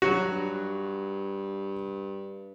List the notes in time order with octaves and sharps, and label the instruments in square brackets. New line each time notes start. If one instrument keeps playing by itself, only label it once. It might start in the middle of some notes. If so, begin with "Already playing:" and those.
[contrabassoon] G2 [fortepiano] F#3 F#4
[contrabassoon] G2